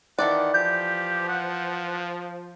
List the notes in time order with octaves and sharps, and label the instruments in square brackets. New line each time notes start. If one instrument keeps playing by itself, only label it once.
[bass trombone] D#3 [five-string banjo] E3 A4 D5 [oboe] F#5
[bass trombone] F3 [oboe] G4 [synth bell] G6
[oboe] F#5